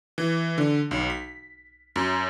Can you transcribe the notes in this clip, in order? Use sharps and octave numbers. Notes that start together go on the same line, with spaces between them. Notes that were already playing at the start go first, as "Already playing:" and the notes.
E3
D3
B1
B6
F#2